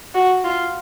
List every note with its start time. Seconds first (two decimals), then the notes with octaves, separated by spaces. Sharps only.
0.15 F#4
0.44 F4